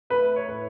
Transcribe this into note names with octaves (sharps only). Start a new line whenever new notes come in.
A3 B4
C#5
A2